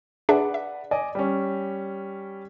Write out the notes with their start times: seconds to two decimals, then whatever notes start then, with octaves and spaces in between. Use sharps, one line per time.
0.29 D4 G#4 B4 D5 E5 F#5
0.54 E5
0.91 D5 D#5 G#5
1.15 G3 C#4